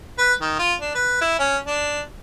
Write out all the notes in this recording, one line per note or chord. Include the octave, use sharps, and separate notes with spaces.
B4
D#3
F4
D4
B4
E4
C#4
D4